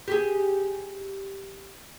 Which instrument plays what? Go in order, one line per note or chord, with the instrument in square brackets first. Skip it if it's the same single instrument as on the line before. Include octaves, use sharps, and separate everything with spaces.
[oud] G4 G#4